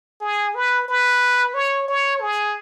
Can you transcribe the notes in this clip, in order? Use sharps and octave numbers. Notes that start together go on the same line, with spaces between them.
G#4
B4
B4
C#5
C#5
G#4